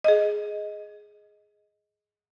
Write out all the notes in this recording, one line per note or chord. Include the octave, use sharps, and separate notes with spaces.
G#4 D#5